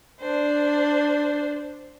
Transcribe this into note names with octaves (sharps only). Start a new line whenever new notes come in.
D4 C5